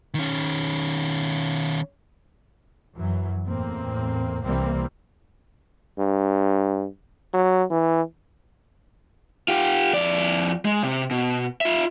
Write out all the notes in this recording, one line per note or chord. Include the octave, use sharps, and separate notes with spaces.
D#3 C#4
F#2 E3 F#3
E2 A2 A#3 C4
C2 E3 G3 A#3 C4
G2
F#3
E3
F4 G4
F2 D5
G#3
C3
B2
F4 E5